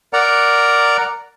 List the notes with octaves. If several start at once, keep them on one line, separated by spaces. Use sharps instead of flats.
A#4 D5 F#5 A#5